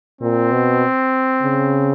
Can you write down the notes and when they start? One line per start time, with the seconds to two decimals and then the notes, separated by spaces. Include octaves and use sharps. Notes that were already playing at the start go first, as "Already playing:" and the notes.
0.21 A#2 C4
0.52 B2
1.43 C#3